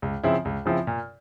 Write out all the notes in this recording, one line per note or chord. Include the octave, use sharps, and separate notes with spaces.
C#2
C#3 F3 C4 E4
C#2
C#3 F3 C4 E4
A#2